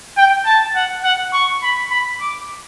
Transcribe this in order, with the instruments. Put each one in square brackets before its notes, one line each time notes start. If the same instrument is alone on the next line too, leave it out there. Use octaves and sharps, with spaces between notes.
[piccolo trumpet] G5
A5
F#5
F#5
C#6
B5
B5
D6